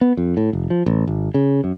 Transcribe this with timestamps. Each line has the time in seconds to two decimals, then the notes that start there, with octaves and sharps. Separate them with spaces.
0.01 B3
0.17 F2
0.37 A2
0.53 F1
0.70 F3
0.86 A1
1.07 G#1
1.34 C#3
1.64 F#2